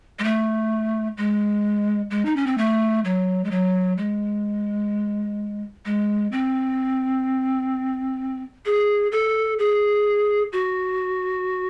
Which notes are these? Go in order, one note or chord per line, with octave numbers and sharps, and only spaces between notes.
G#3
A3
G#3
G#3
D#4
C#4
C4
A3
F#3
G#3
F#3
G#3
G#3
C4
G#4
A4
G#4
F#4